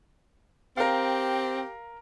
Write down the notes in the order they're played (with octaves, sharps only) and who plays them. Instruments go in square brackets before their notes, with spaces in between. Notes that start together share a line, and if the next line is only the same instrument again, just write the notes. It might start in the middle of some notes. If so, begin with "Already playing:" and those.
[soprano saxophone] C4 [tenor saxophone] G4 [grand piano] A#4 F5